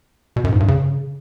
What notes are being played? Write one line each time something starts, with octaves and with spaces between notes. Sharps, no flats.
B2
F#2
G#2
G2
C#3